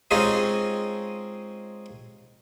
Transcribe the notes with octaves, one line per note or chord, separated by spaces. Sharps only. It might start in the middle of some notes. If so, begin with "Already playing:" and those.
G#3 C4 C#4 D#4 F4 G#4